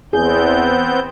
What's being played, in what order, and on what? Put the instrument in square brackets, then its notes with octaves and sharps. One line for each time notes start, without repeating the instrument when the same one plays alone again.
[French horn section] E2 [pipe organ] B3 C4 G6 [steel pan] G#4